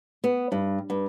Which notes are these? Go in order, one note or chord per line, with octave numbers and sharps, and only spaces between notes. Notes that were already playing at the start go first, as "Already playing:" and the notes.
B3
G2
G2